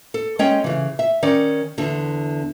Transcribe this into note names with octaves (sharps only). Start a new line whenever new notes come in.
A4
G#3 C#4 C#5 D#5 G5
C#3 E3
E5
D#3 C#4 D5
E2 D3